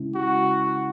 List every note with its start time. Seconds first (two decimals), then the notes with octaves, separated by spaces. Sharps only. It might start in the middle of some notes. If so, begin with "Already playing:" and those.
Already playing: C#3 G#3 C#4 E4
0.15 F#4